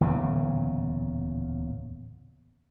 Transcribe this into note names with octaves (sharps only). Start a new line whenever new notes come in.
D1 E2 A#2 C#3